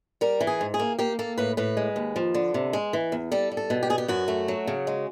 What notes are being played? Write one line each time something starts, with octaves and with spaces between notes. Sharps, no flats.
G3 A#4
E3
G#4
G#2
G#4
A#3
A#3 G4
A#3 A4
A2 B4
A2 B4
G#3
D#2
F3
D3
C3
G#3
E3
E2
G3 A4
G3
A4
B2
G4
B3 G#4
G4
F#2 F#4
A3
F#3
C#3
G#3